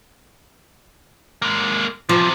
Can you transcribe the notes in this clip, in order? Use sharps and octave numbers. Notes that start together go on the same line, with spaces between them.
G#3 A#3
E2 C3 F3